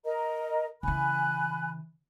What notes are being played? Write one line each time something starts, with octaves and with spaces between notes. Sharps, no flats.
A#4 D#5 A#5
C#3 E3 G#5 B5 F#6